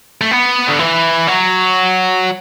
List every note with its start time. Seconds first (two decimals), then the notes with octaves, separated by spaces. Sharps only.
0.21 A3
0.31 B3
0.68 D3
0.79 E3
1.28 F#3